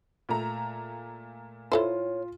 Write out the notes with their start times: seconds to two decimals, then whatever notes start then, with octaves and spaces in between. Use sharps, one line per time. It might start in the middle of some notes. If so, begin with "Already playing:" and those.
0.29 A#2 A3 A#5
1.72 E4 F4 A4 C5 C#5